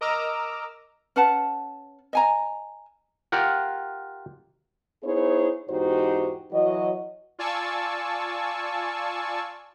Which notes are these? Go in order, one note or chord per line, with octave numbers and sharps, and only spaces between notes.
A#4 D#5 A#5 D6 E6 F6
C#4 B4 F#5 A5
D#5 G#5 A#5
F4 G4 A#4 F#5
B3 D#4 E4 G#4 C5 C#5
E2 G#2 D#4 F#4 G4 C5
E3 F#3 F#4 C#5 D#5
F4 D5 G#5 A5 C#6 E6